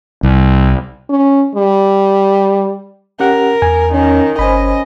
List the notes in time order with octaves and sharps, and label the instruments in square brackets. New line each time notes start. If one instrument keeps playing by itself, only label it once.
[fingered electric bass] C2
[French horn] C#4
G3
[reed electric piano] C#4 G4 F#5 [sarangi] A#4
[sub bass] E2 [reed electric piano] G#5
[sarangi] D#3 [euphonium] C#4
[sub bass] G1 [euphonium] C#4 [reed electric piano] C5 G#5 B5 [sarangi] D#5